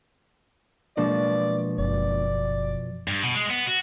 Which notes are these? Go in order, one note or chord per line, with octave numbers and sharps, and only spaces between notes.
B2 F3 G#3 A#3 D4 D5
F#1 D5
G2
B2
G#3
B3
F#4